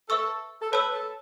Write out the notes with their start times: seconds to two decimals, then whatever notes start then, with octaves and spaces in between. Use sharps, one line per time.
0.09 A4 B4 E5 C#6 E6
0.62 A4
0.73 B4 C#5 A5 E6
0.94 A4